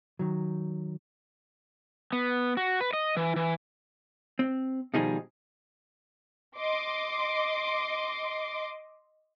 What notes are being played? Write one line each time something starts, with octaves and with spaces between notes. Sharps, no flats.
D#3 F#3
B3
F#4
B4
D#5
E3
E3
C4
B2 D#3 F3 G3 D#4 G#4
D#5 C6 D6